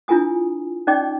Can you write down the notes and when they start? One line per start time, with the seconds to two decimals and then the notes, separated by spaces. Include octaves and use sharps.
0.08 D4 E4 F4 A#4 G#5 D#6
0.87 C#4 D#4 D5 D#5 G5 D6